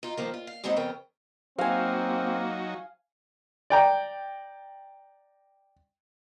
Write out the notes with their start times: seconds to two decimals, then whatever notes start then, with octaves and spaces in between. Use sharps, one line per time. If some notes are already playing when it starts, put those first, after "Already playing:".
0.03 D#4 F4
0.17 G2 D#3 F3 A#3
0.34 F4
0.47 F5
0.64 D#2 G#3 C4 D#4 E4 F#5
0.76 F2 C#3 B3 A#4 G5
1.58 F#3 A#3 C4 D#4 F#4 F5 G#5
3.70 D5 G5 A#5